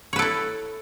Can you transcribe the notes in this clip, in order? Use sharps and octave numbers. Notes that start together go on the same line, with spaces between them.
E4 A4 B4 C#5